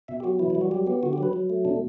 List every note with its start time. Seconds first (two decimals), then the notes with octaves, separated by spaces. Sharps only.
0.08 B2 E5
0.20 G4
0.24 F#3 F#4
0.39 E3 E4
0.50 E4
0.55 G3
0.61 F#4
0.71 F#3 G4
0.87 B3 G4
1.03 D3 F#4
1.13 G4
1.18 F#3 B4
1.33 F#3
1.50 A3
1.65 B2 D4